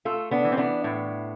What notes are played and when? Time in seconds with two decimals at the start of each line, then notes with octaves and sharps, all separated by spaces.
0.05 A3 F4 A4
0.31 B3 D4
0.44 E3
0.52 C4
0.57 B3 D4
0.84 A2